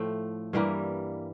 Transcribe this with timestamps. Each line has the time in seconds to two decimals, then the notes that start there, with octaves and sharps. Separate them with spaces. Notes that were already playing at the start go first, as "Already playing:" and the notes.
Already playing: A2 F3 A3 G5
0.53 G2 E3 G3 A#3